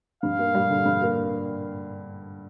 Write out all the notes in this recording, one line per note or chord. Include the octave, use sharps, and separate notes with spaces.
G2 F5
A#3
G3
D3
G2
A#3